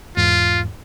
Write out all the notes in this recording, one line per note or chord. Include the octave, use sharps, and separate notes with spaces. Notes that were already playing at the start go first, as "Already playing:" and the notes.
E2 G#2 F4